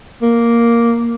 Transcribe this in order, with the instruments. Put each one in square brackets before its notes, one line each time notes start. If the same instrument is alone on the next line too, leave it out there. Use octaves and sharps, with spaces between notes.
[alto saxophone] A#3